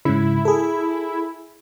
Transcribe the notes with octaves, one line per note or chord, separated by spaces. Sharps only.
G#2 C#3 E4
G#4 A4